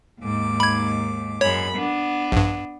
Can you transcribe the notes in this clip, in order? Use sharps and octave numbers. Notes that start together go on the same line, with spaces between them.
D#2 G#2 D6
B5 G#6
F#2 G#3 C#5 B5
B3 D4
A#1 G2